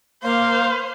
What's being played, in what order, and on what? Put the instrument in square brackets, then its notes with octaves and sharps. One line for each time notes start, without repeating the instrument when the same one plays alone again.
[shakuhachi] A#3 [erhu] C5 [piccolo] F5